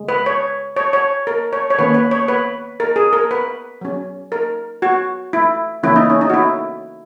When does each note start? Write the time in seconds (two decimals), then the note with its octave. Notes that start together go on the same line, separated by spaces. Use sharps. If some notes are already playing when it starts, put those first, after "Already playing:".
Already playing: C#3 G#3
0.09 B4
0.26 C#5
0.76 C#5
0.93 C#5
1.27 A#4
1.53 C#5
1.70 C#5
1.79 D#3 A#3 C#4 B4
1.94 B4
2.11 C#5
2.28 B4
2.80 A#4
2.96 G#4
3.13 A#4
3.31 B4
3.81 F#3 C#4
4.32 A#4
4.82 F#4
5.33 E4
5.83 C#3 E3 A#3 C#4 E4
5.96 D#4
6.10 C#4
6.21 D#4
6.30 F#4
6.34 E4